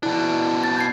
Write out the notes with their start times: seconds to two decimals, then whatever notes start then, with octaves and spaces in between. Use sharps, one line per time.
0.03 B2 D4 E4
0.64 A6
0.77 G6 G#6 C7